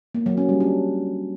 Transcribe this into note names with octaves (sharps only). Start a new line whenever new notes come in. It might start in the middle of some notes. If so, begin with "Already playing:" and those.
A#3
F#3
C#4
G3
D4